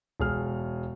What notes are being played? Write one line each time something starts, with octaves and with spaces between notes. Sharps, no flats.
E1 G#4 F6